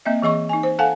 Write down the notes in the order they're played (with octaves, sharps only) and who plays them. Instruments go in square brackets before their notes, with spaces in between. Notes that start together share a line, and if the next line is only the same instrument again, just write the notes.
[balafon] A#3 C4 D#5 E5
E3 G#4 D#5 C#6
D#4 G#5
C5
A4 F5 F#5 G#5 A5